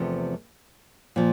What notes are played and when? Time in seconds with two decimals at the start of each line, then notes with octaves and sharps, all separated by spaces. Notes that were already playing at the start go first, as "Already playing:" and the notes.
Already playing: E2 C3 F3 A3
1.16 A#2 F3